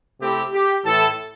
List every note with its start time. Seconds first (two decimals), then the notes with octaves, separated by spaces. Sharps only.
0.20 C3 A3 C4 E4 G4
0.53 G4
0.85 A2 E3 A3 E4 A4